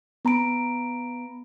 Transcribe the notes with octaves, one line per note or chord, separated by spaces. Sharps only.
B3 A#5 B5 D7